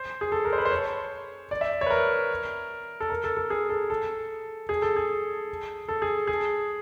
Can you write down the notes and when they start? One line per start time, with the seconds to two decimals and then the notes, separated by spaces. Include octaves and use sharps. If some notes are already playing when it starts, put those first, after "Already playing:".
Already playing: C5
0.21 G#4
0.32 A4
0.45 A#4
0.53 C5
0.58 B4
0.65 C5
0.71 C#5
1.51 D5
1.61 E5
1.81 C#5
1.86 B4
1.90 A#4
3.00 A4
3.10 A#4
3.24 A4
3.37 A4
3.50 G#4
3.69 A4
3.90 A4
4.69 G#4
4.82 A4
4.96 G#4
5.88 A4
6.02 G#4
6.27 G#4